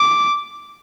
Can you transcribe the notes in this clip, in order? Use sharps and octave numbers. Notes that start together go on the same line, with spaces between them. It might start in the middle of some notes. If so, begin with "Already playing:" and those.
Already playing: D6